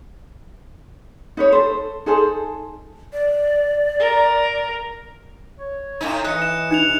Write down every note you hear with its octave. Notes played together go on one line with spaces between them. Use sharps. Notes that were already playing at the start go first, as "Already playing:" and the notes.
D#4 B4 C#5
A4 C5
D#4 G#4 A4 C5
D5
A#4
C#5
A2 C#4 D#4
E3 D#5 F#6 C#7
E7
D4 D#4 F#6 C#7 F7
C3